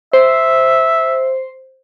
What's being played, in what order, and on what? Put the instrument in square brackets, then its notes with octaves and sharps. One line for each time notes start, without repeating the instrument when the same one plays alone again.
[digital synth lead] C5 [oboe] E5